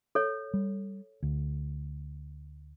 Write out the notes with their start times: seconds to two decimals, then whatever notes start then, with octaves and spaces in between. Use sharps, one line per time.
0.15 A4 C#5
0.54 G3
1.23 D2